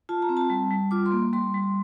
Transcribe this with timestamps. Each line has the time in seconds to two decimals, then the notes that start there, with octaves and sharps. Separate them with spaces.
0.09 F4 A5
0.22 A#5
0.29 C4
0.37 A5
0.50 G3
0.71 G3
0.91 F4 D6
1.06 C6
1.12 A#3
1.33 G3 C6
1.54 G3